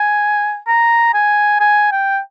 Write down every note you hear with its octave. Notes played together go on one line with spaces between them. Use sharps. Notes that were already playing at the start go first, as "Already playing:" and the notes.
Already playing: G#5
A#5
G#5
G#5
G5